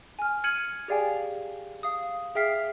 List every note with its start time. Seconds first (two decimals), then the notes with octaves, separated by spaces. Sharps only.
0.19 G#5 F6
0.44 F6 G#6 C#7 D#7 F#7
0.88 G4 G#4 D5 F5 G5 G#5
1.83 F5 D#6
2.35 G#4 E5 G5 F6 B6 C7